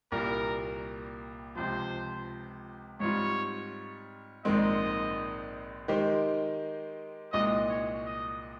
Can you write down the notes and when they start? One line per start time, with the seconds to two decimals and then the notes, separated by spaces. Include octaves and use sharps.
0.12 C2 A#2 G3 A#3 A#4
1.56 C#2 C3 F3 C5
3.00 G#2 G3 C4 F4 C#5
4.44 A#1 G#2 D#3 G#3 C4 D#5
5.88 D#3 G#3 D#4 G4 C5
7.32 C2 A#2 G#3 D#4 D#5
7.69 C#5
8.05 D#5